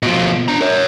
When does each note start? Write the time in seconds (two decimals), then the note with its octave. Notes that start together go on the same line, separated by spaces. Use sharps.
0.03 B2 F3
0.48 D4 A#5
0.61 A#4 C#5